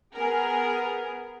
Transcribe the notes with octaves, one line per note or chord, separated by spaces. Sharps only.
B3 G#4 A#4